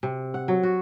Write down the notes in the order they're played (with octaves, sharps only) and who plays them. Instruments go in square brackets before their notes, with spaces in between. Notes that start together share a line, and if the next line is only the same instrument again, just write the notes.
[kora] C3
F#5
F#3
F#4